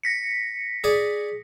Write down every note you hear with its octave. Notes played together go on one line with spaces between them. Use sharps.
A#6 B6 C#7
G#4 D5 G#5